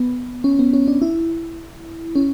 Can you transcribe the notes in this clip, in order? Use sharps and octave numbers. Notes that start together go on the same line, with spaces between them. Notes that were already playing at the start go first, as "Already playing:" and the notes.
Already playing: B3
C#4
B3
C#4
D4
E4
C#4